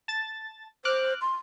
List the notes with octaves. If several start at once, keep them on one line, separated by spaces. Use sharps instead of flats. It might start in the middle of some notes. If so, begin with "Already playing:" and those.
A5 A6
C5 D6 F6 F#6
C6